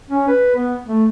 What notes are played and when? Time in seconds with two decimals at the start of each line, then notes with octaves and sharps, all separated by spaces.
0.09 C#4
0.28 B4
0.56 B3
0.85 A3